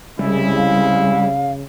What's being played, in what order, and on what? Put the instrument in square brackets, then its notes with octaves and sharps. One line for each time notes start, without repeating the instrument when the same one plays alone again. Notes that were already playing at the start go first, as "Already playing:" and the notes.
[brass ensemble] C2 G#3 E4 [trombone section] C#3 [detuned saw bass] G3
[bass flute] F5